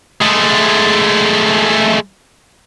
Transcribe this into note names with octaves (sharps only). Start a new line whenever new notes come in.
G#3 A3